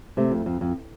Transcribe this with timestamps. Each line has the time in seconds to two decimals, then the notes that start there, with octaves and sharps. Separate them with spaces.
0.17 C3 A3
0.32 F2
0.46 F2
0.61 F2